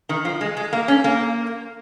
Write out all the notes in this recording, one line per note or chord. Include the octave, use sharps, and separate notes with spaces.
D#3
F3
G#3
G#3
A#3
C#4
A#3